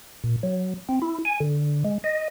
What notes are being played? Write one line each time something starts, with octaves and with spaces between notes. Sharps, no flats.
A#2
F#3
C4
E4
G#5
D3
G#3
D#5